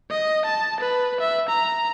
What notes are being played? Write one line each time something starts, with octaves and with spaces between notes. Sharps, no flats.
D#5
A5
B4
E5
A#5